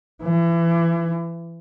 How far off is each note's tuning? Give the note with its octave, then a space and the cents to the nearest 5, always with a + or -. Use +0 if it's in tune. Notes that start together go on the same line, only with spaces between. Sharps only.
E3 +30